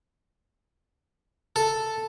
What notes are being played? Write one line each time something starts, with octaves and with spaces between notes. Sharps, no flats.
A4